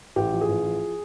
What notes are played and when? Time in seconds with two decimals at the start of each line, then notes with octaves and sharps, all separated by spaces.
0.16 A1 G4
0.33 F3
0.41 G#4
0.48 A1
0.66 F3